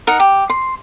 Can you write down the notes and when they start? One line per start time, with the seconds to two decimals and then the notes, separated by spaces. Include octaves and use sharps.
0.07 D#4 A#4 F#5
0.19 G4
0.50 C6